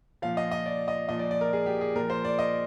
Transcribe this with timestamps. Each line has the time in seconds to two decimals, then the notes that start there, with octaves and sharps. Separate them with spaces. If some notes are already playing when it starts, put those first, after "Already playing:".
0.22 A#2 F3 F5
0.37 D#5
0.51 D#5
0.66 D5
0.88 D#5
1.09 A#2 F3 D#5
1.19 D5
1.31 D5
1.41 A#4
1.53 G#4
1.66 G4
1.81 G#4
1.95 A#2 F3 A#4
2.10 C5
2.25 D5
2.39 D#5